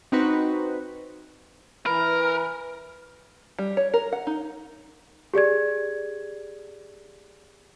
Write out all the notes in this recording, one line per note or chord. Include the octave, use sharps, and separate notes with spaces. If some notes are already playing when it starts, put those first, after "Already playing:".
C4 D#4 F#4 B4
E3 A#4 B4 B5
G3
C#5
A#4
F#5
D#4
G4 G#4 D5 G#6